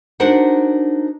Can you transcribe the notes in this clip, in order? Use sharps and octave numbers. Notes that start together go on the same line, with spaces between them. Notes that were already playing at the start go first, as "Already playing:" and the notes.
D4 D#4 F#4 A#4 C5 F#5